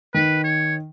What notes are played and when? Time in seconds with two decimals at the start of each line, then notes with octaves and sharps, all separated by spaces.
0.14 D#3 B4
0.44 C#5